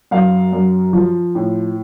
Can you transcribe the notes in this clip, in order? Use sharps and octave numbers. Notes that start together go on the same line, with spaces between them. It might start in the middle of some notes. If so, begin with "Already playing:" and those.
F#2 F5
F#2
F3
A2